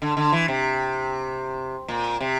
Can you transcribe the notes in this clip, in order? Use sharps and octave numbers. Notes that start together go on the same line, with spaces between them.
D3
D3
E3
C3
A#2
C3